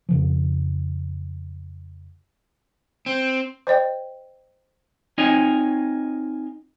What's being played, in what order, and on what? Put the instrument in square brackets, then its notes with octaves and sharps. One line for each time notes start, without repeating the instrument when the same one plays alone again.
[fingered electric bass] F2 C#3 F3
[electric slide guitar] C4
[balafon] C5 D5 D#5 G5
[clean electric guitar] C4 D#4 F4 C#5 D#5 G#5